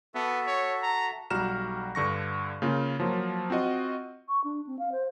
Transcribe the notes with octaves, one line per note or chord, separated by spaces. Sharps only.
B3 F#4 A4 E5
C#5
A#5
B1 G3 F#4 A#5 F6 E7
G2 D3 C#6 A#6
C#3 A#3 F4
F3 F#3 A#3 F4
C4 F4 F#4 D#5
C#6
D4
C4
F5
C5